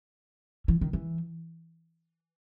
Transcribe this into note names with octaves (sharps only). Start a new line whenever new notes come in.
E3
D#3
E3